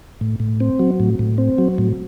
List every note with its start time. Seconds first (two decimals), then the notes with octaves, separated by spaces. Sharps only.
0.21 A2
0.40 A2
0.60 C4
0.79 F#3
1.00 A2
1.19 A2
1.38 C4
1.58 F#3
1.78 A2